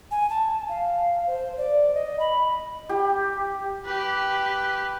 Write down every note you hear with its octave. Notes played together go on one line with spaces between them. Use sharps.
G#5
A5
F5
C5
D5
D#5
B5
G4
G4 B4